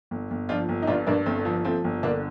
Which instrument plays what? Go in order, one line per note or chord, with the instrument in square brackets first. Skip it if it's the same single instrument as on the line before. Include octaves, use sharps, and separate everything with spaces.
[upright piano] G1
G1
F3 D4 F4
G1
D#4
G2 D4 F4
G2 A#3 D4
G1 A3 C4
F3
F3 A3 C4
G1
D3 A#3 D4